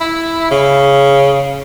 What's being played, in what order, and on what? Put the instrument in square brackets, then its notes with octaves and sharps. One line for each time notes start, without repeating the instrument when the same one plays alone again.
[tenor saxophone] E4
C#3